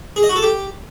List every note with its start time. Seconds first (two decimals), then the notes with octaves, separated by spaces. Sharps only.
0.16 G#4
0.23 D#5
0.29 F#4
0.36 A4
0.42 G4